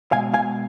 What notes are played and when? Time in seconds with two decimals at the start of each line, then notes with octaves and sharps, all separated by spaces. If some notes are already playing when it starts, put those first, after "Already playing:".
0.12 B2 G#3 F5 G#5
0.34 F5 G#5